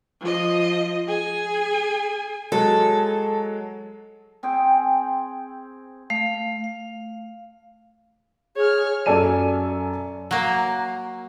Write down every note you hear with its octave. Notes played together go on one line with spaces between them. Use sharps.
F3 D#5
G#4 G#5
F#3 G#3 A4
C4 G#4 G5
A3 F5
F5
G#4 C#5 F6
F#2 A4 D5 G#5 D#7
F#3 A#3